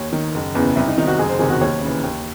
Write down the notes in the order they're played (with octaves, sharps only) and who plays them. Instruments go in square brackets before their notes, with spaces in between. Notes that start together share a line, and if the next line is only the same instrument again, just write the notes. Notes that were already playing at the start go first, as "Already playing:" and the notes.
Already playing: [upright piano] D#2 C#5
D#3
F#1
E2 C#3 E3
C2 E4
D#4
C3 D#3 D#4
F#4
F#1 G#4
C5
E2 C3 D#3 G#4
F#4
D#2 C#5
C#3 E3
D#2